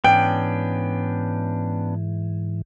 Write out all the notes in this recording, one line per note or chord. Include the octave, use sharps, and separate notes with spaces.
G#2 E3 B3 C#4 D4 G5